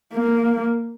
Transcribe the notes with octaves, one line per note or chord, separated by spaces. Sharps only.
A#3